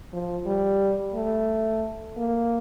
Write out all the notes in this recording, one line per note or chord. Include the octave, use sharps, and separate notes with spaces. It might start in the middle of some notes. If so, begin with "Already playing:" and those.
F3
G3
A3
A#3